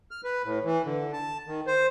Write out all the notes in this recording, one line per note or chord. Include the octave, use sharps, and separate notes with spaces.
F6
B4
A2
E3
D3
A5
D#3
C5